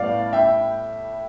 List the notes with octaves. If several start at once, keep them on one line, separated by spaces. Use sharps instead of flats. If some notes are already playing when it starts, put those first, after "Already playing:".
Already playing: A2 G3 B3 D5 F5
E5 G5